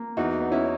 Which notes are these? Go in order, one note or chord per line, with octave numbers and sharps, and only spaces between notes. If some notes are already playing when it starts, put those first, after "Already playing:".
Already playing: A#3
E2 D#4 F#4
B3
C#4 E4